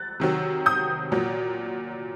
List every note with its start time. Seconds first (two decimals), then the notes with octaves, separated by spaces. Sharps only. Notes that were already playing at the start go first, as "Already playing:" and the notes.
Already playing: F#6 A6
0.20 C3 D#3 F#3
0.66 D#6 G6
1.12 A#2 F#3